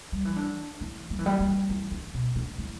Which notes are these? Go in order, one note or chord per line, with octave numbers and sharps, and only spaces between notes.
G3
E3
D3
E3
G3
E3
G3
G3
E3
D3
B2
D3
E3